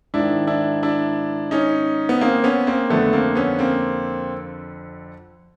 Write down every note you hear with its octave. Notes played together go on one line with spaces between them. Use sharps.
G#2 D#3 D4 E4
D4 E4
D4 E4
C#4 D#4
B3
A#3 C4
B3 C#4
A#3 C4
F2 D3 A3 B3
A#3 C4
B3 C#4
A#3 C4